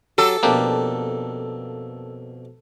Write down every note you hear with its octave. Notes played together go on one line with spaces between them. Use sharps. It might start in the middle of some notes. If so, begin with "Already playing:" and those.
F#3 G4 A4
F2 B2 A#3 D4 G4